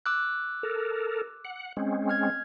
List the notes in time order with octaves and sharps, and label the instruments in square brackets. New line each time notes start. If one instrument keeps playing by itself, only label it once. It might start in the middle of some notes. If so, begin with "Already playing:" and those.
[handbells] D6 E6 F#6
[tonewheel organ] A4 A#4
F#5
G#3 C4 C#4
[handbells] F6 G#6